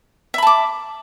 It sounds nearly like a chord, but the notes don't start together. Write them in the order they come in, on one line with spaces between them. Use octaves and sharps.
E5 B5 A5 D6